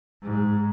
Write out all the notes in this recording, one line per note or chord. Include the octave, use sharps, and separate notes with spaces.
G#2